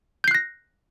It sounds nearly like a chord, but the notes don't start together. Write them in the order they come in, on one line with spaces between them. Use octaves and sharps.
G6 C7 F#6 A#6